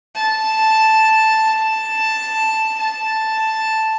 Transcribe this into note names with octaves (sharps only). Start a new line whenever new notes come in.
A5
A5
A5